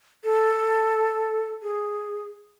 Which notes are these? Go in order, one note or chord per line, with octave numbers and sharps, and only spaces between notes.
A4
G#4